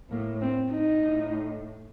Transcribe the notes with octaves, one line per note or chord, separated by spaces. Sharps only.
A2 A#3
C4
D#4
A2